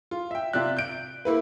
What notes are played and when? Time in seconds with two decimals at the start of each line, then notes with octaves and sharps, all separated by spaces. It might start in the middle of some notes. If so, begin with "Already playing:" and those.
0.11 F4
0.31 E5 G5
0.53 C3 F4 D5 E5 F#6
0.77 G6 D7
1.25 A#3 E4 B4